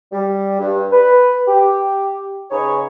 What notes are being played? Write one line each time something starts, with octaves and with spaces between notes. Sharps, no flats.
G3
G2
B4
G4
C#3 D#4 G#4 B4 C#5